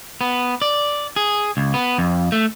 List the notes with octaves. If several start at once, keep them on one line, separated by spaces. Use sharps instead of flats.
B3
D5
G#4
C#2
B3
F2
A3